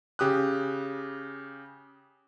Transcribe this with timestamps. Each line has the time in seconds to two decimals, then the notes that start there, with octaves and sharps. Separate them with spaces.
0.19 C#3 G4 D#6 F#6